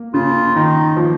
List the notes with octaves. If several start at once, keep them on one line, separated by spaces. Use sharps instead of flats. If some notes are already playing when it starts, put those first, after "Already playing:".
Already playing: A#3
C#3 F4
D#3 D#4
F3 A#3